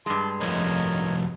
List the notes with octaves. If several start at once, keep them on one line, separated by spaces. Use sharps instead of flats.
G2 G#3 A5 C6
C2 F2 A#4 C#5 D#5